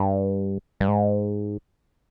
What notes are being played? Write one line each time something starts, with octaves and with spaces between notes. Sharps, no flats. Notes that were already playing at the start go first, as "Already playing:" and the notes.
Already playing: G2
G2
G#2